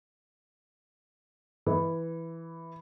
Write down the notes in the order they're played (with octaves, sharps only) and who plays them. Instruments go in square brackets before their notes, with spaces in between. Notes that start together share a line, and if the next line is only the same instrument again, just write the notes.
[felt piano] E3